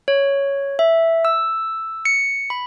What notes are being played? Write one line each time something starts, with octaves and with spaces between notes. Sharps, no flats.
C#5
E5
E6
C#7
B5